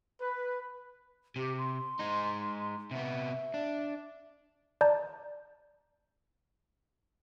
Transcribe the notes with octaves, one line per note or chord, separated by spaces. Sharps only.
B4
C3 G4
C6
G#3 D#4
C3 B3 E5
D4
D5 A5 A#5 G6